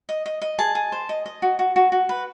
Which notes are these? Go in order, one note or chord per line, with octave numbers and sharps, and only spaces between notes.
D#5
D#5
D#5
G#4 A5
G#4
C5
D#5
D#5
F#4
F#4
F#4
F#4
B4